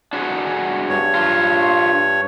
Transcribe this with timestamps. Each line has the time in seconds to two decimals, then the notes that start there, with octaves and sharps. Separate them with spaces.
0.13 D4 F#4 G#4
0.90 G2 C#5
1.15 D4 F4